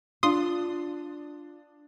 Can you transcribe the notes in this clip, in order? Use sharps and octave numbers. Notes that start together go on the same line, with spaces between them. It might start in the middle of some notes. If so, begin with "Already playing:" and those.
D4 F4 C6 D#6